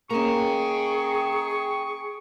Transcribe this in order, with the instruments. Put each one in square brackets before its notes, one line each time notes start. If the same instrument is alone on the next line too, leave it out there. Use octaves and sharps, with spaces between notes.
[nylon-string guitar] A#3 C#4 [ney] G#4 [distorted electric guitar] G5 A#5 [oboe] C#6